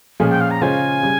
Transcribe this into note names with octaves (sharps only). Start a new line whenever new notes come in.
A#2 F3 G#3 C#4 G#4
G5
F5
A#5
C#3 G#3 C#4 F4 C5 G#5
C#3 G3